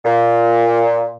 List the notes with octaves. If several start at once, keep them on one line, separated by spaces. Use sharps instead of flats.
A#2